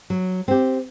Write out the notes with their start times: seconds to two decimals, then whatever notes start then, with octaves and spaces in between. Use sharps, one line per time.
0.10 F#3
0.48 C4 G4